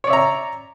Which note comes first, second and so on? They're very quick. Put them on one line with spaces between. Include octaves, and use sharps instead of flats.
C#5 D5 E5 A#5